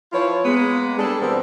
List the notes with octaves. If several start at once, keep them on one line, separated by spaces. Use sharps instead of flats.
F3 E4 F4 B4 C#5
G#3 A#3 B3
G3 D4 G#4 A4
B2 F3 G3 B3 C4 A#4